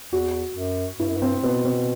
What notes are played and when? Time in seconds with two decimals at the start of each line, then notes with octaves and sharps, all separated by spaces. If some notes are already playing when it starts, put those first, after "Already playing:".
0.13 E2 F#4
0.57 F#2
0.99 G2 E4
1.09 F#2
1.17 G2 C4
1.43 B2 B3
1.65 C4